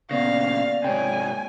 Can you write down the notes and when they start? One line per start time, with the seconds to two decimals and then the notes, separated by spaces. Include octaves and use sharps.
0.11 A#2 C#3 B3 D5 F5 A#6
0.84 G#2 C3 C#5 G5 G#5